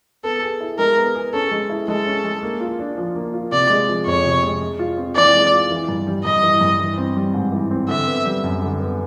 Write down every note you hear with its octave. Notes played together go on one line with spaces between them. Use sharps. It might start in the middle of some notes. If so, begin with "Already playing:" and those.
B3 A4
G#4
E4
G#3 A#4
B3
G#4
C#4 A4
G#3
E4
G#3 A4
C#4
G#3
A#3
F4
D4
F3
A#3
F4
C3 D5
G#3
F3
F2 C#5
C3
G#3
G#3
F4
C4
E3 D5
G#3
F4
E3
G2
G3
G2 D#5
E3
G2
E3
C4
G3
G#2
E3
C4
D3 E5
B3
G3
F#2
D3
B3